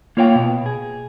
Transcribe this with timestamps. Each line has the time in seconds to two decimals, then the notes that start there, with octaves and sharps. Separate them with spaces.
0.17 A#3 F4 C#5 F5 G5
0.35 B2
0.66 G#4